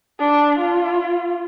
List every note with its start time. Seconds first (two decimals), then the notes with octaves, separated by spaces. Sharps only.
0.19 D4
0.59 F4